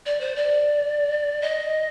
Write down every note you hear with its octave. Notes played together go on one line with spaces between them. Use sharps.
D5
C5
D5
D#5